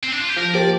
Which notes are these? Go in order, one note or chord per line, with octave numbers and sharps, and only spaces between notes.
C4
D4
F4
G4
F3 A#4
A#3 G4 C5 D5